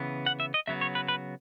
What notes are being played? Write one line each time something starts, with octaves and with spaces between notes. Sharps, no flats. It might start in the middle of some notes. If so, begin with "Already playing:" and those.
Already playing: C#3 E3 B3
F#5
E5
D#5
C#3 F#3 B3 E5
C#5
B4
B4